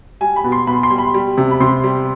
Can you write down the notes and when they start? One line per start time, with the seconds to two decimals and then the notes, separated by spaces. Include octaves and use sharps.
0.21 G3 G#5
0.36 B5
0.44 B2
0.52 C6
0.67 B2 B5
0.83 C6
0.90 G3
0.98 B5
1.14 G3
1.37 C3
1.51 B5
1.60 C3 C6
1.84 G3